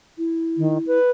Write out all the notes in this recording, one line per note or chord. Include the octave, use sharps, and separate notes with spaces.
E4
D#3
B4